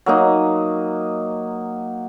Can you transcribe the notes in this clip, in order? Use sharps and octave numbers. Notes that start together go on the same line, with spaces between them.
F#3 A#3 D#4